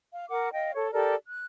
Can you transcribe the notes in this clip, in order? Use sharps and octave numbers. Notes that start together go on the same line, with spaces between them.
F5
A#4 F#5 D6
D#5 F5 G5
A4 C#5
G4 A4 A#4 D5
F#6